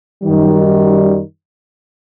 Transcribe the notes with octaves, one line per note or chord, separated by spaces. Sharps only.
F#2 D#3 G3